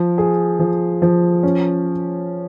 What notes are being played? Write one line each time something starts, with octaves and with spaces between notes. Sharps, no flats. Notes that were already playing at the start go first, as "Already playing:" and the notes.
Already playing: F3
G#4
F3
F3
C#4